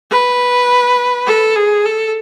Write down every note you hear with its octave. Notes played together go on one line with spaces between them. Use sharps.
B4
A4
G#4
A4